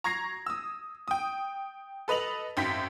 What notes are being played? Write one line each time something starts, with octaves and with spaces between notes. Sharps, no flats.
A#5 C#6 G#6 A#6 C7
D#6 E6
G5 D#6
A4 B4 D#5 F7 F#7
G#1 F#2 G5 G6 B6